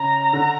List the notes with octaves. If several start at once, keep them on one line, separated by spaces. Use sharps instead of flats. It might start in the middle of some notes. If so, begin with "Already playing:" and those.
Already playing: C#3 A#5
D3